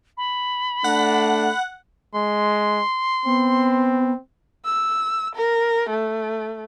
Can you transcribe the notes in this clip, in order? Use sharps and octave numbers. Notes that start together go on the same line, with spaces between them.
B5
A3 D4 F#5
G#3 C6
B3 C4
E6
A#4
A3